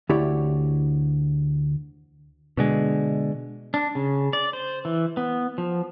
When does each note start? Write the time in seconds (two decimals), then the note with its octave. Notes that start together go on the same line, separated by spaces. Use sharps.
0.09 D2 E4 G4 C#5 D5
2.57 B2 D3 G#3
3.74 D4
3.95 C#3
4.33 D5
4.53 C5
4.85 E3
5.17 B3
5.58 F3